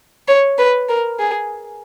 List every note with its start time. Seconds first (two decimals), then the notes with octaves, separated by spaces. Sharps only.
0.28 C#5
0.58 B4
0.89 A#4
1.20 G#4